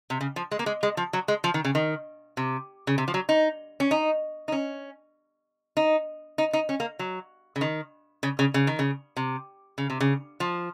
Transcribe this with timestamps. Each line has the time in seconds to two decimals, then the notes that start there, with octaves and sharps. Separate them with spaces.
0.10 C3
0.21 C#3
0.36 F3
0.51 G#3
0.59 A#3
0.66 G#3
0.83 G#3
0.97 F3
1.13 F#3
1.28 G#3
1.44 F3
1.54 D#3
1.65 C#3
1.75 D#3
2.37 C3
2.87 C#3
2.98 C3
3.08 F3
3.14 F#3
3.29 D#4
3.80 C#4
3.91 D#4
4.48 D#4
4.52 C#4
5.77 D#4
6.38 D#4
6.53 D#4
6.69 C#4
6.80 A#3
6.99 F#3
7.56 C#3
7.61 D#3
8.23 C#3
8.39 C#3
8.54 C#3
8.67 D#3
8.79 C#3
9.17 C3
9.78 C#3
9.90 C3
10.00 C#3
10.40 F3